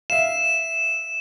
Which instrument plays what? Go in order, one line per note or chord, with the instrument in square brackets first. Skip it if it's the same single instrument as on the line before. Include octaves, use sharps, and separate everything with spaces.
[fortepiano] E5 F5 [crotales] E7